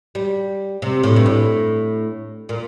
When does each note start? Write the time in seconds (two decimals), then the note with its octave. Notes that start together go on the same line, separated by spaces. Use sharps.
0.15 G3
0.82 C3
1.04 A2
1.16 G2
1.26 A2
2.49 A#2